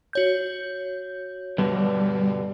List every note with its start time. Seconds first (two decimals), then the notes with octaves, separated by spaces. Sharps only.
0.13 F#4 C#5 G6
1.58 G2 B2 D3 G3